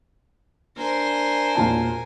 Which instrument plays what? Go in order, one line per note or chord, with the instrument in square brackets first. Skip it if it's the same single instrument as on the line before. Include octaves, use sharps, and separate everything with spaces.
[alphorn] D4 [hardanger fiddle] A#4 G#5 [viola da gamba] C5
[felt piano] E1 A#2 A5